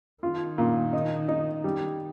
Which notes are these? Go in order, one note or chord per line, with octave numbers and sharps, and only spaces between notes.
D#3 F4
A#2
D#4
D#4
G3